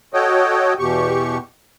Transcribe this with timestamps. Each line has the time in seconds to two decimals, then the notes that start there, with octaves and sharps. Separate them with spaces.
0.14 F#4 A4 C#5 D#5 G5
0.79 E2 B2 G4 C#6